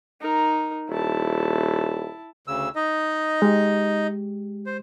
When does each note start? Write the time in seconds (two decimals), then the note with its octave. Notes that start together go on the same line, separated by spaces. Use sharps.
0.21 D#4 A#4
0.89 D#1 E4 A5
2.47 D2 C#3 E6
2.75 D#4 D#5
3.42 G#3 G4
4.66 C5